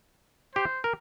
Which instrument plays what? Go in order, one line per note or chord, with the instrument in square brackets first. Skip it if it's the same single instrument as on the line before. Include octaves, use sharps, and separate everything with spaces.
[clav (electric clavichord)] G4 [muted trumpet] C5
[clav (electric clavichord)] A#4